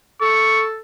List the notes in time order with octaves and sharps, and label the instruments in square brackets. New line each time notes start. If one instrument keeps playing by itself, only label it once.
[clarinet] A4 [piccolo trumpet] C#6